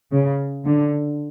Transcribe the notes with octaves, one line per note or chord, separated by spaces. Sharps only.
C#3
D3